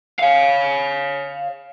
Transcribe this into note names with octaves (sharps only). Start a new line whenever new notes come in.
C#5 F5